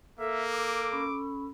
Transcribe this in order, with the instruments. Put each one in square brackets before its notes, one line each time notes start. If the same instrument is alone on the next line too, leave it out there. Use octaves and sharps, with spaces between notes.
[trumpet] A#3 [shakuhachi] A4 [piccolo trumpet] E5
[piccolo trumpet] D6
[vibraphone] C#4 B5